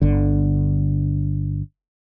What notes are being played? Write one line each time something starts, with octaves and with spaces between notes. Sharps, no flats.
G1 D3